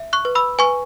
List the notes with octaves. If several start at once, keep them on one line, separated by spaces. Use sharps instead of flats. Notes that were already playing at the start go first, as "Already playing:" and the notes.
Already playing: E5
C#6 F#6
B4
B5 E6
B4 G#5 C#6